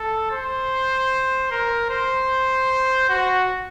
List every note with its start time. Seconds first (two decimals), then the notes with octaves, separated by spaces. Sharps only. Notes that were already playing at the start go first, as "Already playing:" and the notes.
Already playing: A4
0.31 C5
1.51 A#4
1.90 C5
3.09 F#4